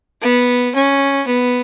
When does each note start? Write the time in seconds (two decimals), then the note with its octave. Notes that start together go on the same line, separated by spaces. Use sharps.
0.22 B3
0.74 C#4
1.27 B3